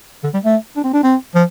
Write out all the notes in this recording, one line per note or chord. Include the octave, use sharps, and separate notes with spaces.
D3
G3
A3
D4
C4
D4
C4
F3